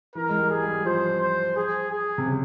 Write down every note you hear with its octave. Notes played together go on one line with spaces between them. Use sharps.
E3 A#4
G#3
G3
G#4
G3
F3 C5
C5
G#4
G#4
C3
C#3